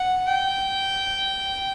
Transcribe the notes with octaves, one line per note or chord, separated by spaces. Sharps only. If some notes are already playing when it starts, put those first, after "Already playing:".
Already playing: F#5
G5